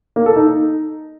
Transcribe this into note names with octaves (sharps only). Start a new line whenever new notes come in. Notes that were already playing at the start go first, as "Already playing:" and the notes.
A#3
A4
D#4